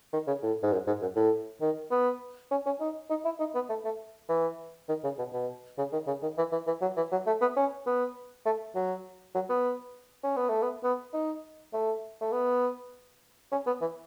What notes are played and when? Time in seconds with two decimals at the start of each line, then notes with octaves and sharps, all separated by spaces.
0.13 D#3
0.27 C#3
0.43 A2
0.63 G#2
0.73 F#2
0.87 G#2
1.02 F#2
1.16 A2
1.61 D#3
1.91 B3
2.51 C#4
2.66 C#4
2.80 D#4
3.10 D#4
3.25 E4
3.39 D#4
3.55 B3
3.69 A3
3.85 A3
4.29 E3
4.89 D#3
5.04 C#3
5.18 B2
5.33 B2
5.78 C#3
5.93 D#3
6.07 C#3
6.22 D#3
6.38 E3
6.52 E3
6.67 E3
6.82 F#3
6.97 E3
7.12 F#3
7.27 A3
7.41 B3
7.56 C#4
7.86 B3
8.46 A3
8.75 F#3
9.35 F#3
9.50 B3
10.24 C#4
10.37 B3
10.49 A3
10.62 B3
10.83 B3
11.14 D#4
11.73 A3
12.21 A3
12.32 B3
13.52 C#4
13.66 B3
13.81 E3